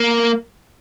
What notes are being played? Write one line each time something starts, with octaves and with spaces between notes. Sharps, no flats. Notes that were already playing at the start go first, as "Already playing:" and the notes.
Already playing: A#3